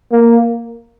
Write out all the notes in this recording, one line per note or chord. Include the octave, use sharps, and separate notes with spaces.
A#3